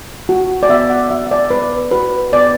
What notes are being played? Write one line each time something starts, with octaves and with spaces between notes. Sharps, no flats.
F#4
D5
B3 E5
F#5
F#4 E5
E5
D5
B3 B4
F#4 B4
B3 D5